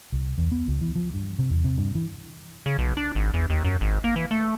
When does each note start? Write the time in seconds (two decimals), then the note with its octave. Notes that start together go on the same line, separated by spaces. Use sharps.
0.12 C2
0.38 E2
0.52 B3
0.68 C#2
0.81 E3
0.95 F3
1.14 G2
1.39 C3
1.50 E2
1.64 C3
1.78 G2
1.95 E3
2.66 C#3
2.78 B1
2.97 D4
3.15 G#1
3.34 E2
3.50 D#2
3.65 F#2
3.81 G#1
4.04 A#3
4.16 E3
4.31 A3